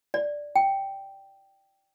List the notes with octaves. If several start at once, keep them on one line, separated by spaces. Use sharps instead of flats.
D5
G5